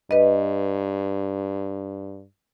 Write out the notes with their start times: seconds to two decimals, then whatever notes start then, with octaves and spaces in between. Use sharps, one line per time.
0.11 G2 B4 D#5